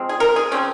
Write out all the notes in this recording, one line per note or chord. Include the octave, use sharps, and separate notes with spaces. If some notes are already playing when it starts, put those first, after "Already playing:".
Already playing: F3 G#3 C4
G#4
A#4
G#4
C#3 F3 C4 C#4